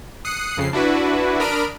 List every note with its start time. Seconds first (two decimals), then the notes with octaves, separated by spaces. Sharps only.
0.25 D#6 F#6 C7 C#7
0.57 F2 C#3 C7
0.73 D4 E4 F#4 B4
1.39 D4 A#4 B5 D#6 F6 D7